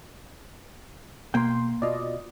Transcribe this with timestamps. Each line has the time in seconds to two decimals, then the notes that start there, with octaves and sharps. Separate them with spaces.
1.34 B2 A#3 G5 C6
1.82 B2 F4 D5 D#5